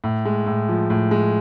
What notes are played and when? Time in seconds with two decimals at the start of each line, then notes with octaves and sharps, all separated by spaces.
0.04 A2
0.25 G#3
0.46 A2
0.69 F3
0.90 A2
1.11 G#3